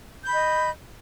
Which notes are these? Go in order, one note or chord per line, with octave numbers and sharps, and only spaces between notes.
D#5 B5 G6